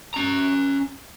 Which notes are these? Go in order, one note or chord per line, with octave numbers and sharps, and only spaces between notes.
C#4 A#5